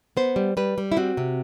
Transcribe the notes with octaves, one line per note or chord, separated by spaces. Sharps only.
B3 C5
G3
G3 B4
G3
E4
C4 F#4
C3